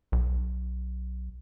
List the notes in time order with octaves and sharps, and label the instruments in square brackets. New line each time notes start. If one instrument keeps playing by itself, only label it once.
[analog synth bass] B1